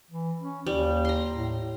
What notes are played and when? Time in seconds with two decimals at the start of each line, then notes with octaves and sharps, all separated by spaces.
0.10 E3
0.41 C#4
0.66 D#2 G3
1.05 A#5 C6
1.33 A2